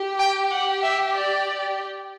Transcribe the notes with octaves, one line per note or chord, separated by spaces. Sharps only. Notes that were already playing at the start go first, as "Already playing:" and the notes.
Already playing: G4
G5
F#5
E5
D5